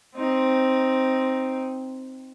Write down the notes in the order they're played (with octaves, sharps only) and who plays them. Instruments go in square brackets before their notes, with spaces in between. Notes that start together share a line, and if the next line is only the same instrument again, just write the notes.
[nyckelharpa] C4 D#4